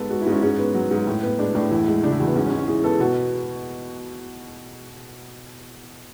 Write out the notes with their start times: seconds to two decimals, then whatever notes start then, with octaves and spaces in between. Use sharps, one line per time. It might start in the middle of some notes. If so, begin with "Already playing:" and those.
Already playing: G#2 B3 A4
0.10 G#3 F#4
0.21 E4
0.26 G#2
0.32 C#4
0.42 G#2 C#4
0.59 B3
0.74 F#3
0.91 G#2
1.07 A2
1.23 B3
1.39 G#3 D4
1.55 A2 D4
1.71 E2 E4
1.88 G#3
2.04 C#3 D4
2.11 E4
2.20 E2 F#4
2.27 B3
2.35 G#2 C#4
2.46 C#4
2.51 G#3
2.57 C#4
2.68 E3 G#4
2.84 B3 A4
3.00 B2 F#4